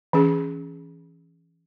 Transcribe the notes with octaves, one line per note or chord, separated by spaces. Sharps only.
E3 C#4 G#4